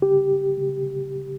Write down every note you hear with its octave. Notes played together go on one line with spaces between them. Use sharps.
G4